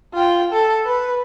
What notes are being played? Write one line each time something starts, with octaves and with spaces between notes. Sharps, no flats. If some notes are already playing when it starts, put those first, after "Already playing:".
F4 G5
A4
B4